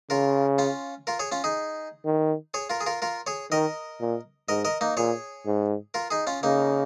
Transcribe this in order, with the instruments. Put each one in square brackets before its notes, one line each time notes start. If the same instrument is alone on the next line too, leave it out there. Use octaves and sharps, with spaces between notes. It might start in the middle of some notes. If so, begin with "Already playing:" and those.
[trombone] C#3 [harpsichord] F4 A#4
[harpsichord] C#4 F4
F4 A#4
G#4 C#5
C#4 F4
D#4 G#4
[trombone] D#3
[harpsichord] G#4 C#5
F4 A#4
G#4
F4 A#4
F4 A#4
G#4 C#5
[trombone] D#3 [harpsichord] A#4 D#5
[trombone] A#2
[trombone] G#2 [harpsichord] A#4 D#5
[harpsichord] A#4 D#5
A#3 D#4
[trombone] A#2 [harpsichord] G#4 C#5
[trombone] G#2
[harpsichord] F4 A#4
D#4 G#4
C#4 F4
[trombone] C#3 [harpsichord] A#3 D#4